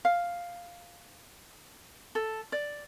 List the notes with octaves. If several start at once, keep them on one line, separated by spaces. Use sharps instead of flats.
F5
A4
D5